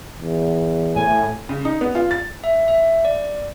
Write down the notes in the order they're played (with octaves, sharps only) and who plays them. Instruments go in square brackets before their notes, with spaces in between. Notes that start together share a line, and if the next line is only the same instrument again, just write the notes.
[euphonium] E2
[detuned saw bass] A2 [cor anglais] G#5
[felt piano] C#3
D#4
B3
F4
A6
[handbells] E5
E5
D5